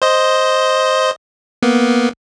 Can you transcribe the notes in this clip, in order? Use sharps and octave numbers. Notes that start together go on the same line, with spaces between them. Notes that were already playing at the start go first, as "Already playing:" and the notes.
C5 D#5
A#3 B3